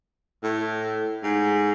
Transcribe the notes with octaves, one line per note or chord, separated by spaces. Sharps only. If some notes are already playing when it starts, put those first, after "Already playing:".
A2
G#2